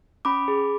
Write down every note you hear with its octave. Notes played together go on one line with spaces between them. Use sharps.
C#4 B5 D6
G#4